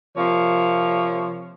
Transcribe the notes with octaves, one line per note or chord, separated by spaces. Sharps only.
C3 F3 A#3 C#5